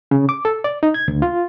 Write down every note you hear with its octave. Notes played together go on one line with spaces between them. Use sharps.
C#3
D6
A4
D5
D#4
G#6
D2
F4